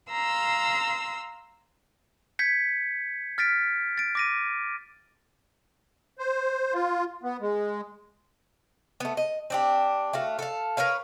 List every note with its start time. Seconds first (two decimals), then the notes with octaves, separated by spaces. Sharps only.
0.11 F5 A#5 C6 E6
2.39 G6 G#6 B6 C#7
3.38 F6 A6 B6 D7
3.98 A6 D7
4.15 D6 A#6 D#7
6.19 C5
6.74 F4
7.23 B3
7.41 G#3
9.00 A3 B3
9.17 D#5
9.50 C4 D4 G4
10.13 A3 F#4 F5
10.39 A4 F5
10.77 A#4 B4 C#5 F5